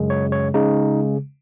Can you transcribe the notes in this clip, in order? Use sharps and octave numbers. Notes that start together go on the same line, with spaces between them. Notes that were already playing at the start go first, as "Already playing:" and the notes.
Already playing: F#2 C#3 G#3
C#5
C#5
C#3 G#3 D#4